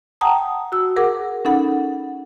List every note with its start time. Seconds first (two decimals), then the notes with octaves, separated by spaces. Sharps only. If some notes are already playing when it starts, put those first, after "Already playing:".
0.21 F#5 G5 A5 A#5 D#6
0.72 F#4 E6
0.96 G#4 A#4 F#5 D6
1.45 C#4 D#4 A4 F#5 B5